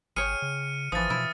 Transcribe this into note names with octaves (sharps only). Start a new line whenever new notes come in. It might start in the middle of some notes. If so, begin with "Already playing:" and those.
G#1 G#4 C#5 G5 F6 C#7 D#7
C#3
G#1 E3 F3 D#6 A6
B2 E4